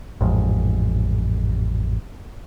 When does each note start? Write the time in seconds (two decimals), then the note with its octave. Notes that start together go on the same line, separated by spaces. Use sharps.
0.21 A1 F2 G#2